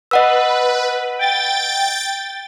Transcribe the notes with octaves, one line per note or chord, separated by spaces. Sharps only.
B4 D#5 F#5 E6
G5 A6